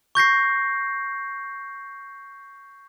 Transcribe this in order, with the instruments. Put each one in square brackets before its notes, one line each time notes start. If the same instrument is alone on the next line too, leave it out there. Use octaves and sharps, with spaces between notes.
[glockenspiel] C#6 G6 A#6 C7